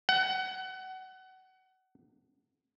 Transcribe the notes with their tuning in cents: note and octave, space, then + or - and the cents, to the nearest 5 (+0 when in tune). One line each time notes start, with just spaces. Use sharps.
F#5 +25